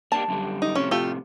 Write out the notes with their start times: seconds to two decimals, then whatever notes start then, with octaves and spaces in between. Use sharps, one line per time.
0.12 A#3 D4 G4 A5
0.28 F#2 D3 G3
0.62 D#4
0.75 A2 C3 F3 C#4
0.91 A3 F4 G4